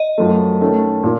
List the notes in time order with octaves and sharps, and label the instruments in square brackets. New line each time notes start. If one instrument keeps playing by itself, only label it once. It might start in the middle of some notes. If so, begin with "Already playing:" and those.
Already playing: [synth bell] D#5
[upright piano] F#2 F3 A3
D#3 A3 C#4 A4
A#2